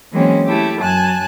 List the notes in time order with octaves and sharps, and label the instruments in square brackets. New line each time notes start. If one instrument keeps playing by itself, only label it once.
[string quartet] E3 F#3 G#3 A#3 C4 C#4
A3 E4 G4
F#2 F#3 G#5 A5 F#6